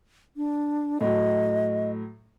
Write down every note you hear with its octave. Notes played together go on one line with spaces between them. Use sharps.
D4
A2 F#3 D#5